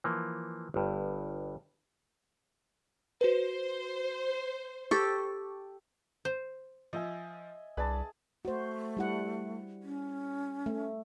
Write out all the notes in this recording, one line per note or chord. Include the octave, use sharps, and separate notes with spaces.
E3 F3 A#3
G1 G2
F#4 B4 C5
G4 A4 C#6
C5
F3 D#5 E5 G#5
C2 D4 G#4 B4 A5
A3 F#4 C5
G3 E4 F#5
C#4
A3